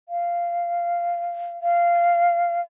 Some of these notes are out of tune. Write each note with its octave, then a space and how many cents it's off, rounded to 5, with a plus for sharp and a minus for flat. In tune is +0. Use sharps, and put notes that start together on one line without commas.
F5 -10
F5 -15